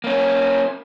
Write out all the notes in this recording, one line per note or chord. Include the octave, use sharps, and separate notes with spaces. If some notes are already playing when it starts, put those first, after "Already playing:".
A#3 C#4